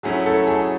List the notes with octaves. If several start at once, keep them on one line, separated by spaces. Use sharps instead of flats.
F#3 A3 C#4 E4 G#4
A4
G#4